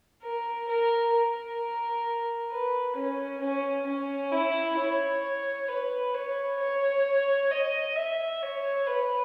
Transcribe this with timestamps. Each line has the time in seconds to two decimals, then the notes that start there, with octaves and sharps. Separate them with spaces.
0.23 A#4
0.68 A#4
1.14 A#4
2.51 B4
2.96 C#4
3.41 C#4
3.86 C#4
4.32 E4
4.78 C#5
5.69 B4
6.14 C#5
6.60 C#5
7.51 D#5
7.96 E5
8.42 C#5
8.87 B4